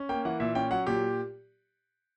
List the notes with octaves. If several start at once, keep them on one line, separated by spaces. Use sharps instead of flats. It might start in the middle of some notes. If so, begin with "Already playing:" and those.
Already playing: C#4
A#3 G5
E3 F#5
A#2 E5
C#4 G5
F#3 F#5
A#2 G4